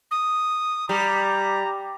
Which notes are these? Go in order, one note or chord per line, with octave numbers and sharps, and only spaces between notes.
D#6
G3 A#5